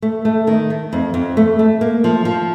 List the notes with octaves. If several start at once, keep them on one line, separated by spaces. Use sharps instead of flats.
A3
A3
D#3
A3
F2
F2
A3
A3
A#3
F3
F3